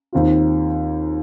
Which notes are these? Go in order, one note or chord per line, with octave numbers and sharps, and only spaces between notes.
D#2 D#3 C4 F4